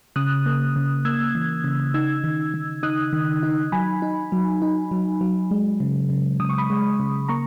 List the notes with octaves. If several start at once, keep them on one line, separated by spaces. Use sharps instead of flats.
C#3 D#6 F#6
A#3
C#3
A#3 E6 G#6
E3
C#3
D#4 E6 G#6
D#3
D#3
D#4 D#6 F#6
D#3
D#4
F#3 G#5 B5
D#4
F#3
D#4
F#3
F#3
G#3
C#3
C#3
C#3 D#6
C#6
B5 D#6
G#3
C#3
A#3 A#5 C#6